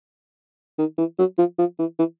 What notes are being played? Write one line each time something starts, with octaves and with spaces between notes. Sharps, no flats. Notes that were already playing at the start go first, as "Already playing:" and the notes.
D#3
E3
F#3
F3
F3
E3
E3